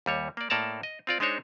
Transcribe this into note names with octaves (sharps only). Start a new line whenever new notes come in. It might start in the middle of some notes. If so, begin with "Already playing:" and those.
D#2 G3 C#5
A#3 D5
A2 A#3 A4 D5 A5 A#5
D#5
C4 F4 D5
G#3 D4 D#4 C5 C#5